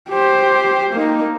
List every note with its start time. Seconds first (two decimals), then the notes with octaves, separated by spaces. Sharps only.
0.10 G4 C5
0.93 A#3 D#4